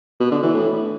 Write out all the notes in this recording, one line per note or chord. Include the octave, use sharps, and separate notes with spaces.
B2
D3
E3
A2